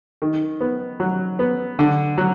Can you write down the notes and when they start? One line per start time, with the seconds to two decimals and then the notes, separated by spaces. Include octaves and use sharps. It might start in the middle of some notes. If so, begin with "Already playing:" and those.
0.22 D#3
0.61 B3
1.00 F#3
1.39 B3
1.79 D3
2.18 F#3